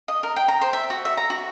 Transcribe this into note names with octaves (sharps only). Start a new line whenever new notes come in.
D#5
A#4
G5
A#5
C5
E5
F#4
E5
A#5
F#4